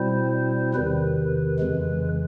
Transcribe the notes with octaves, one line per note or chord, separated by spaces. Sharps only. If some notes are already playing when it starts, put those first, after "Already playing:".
Already playing: B2 G3 C4 E4 C5
E2 C3 D#3 B4
F2 C#3 E3 G#3